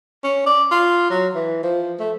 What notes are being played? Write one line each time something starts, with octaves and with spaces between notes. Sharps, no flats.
C#4
D5
F4
F#3
E3
F3
A3